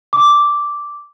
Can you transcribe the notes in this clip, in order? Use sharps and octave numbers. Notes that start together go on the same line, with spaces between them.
D6